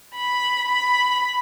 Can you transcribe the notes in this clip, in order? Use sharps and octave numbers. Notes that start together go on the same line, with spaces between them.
B5
B5